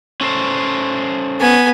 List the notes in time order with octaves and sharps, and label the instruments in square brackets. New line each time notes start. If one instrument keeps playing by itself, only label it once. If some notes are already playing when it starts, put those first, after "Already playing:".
[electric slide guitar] C#4 A4 C5
[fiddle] B3 G#5